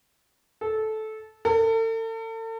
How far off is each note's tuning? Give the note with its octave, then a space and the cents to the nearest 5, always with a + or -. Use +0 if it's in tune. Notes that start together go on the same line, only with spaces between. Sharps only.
A4 -15
A4 +40